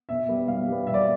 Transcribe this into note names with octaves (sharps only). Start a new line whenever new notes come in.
B2 E5
G3 B3
B2 F5
G3 B3
B2 E5
D5